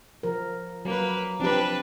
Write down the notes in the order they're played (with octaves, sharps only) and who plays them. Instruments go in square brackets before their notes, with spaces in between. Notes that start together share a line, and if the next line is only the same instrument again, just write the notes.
[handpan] F3 A#4
[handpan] F#3 [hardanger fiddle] A#3 B4
[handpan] F3 C4 G4 [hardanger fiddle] D4 B4